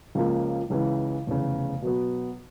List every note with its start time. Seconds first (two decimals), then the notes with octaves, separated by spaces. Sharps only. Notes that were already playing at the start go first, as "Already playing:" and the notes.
0.15 C#2 C#3 F3 A#3
0.70 C#2 C#3 E3
1.27 F1 E2 C#3
1.82 B2 F#3 B3